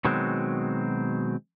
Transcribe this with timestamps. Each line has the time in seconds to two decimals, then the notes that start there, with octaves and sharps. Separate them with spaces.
0.05 B2 D#3 F#3 G#3 C4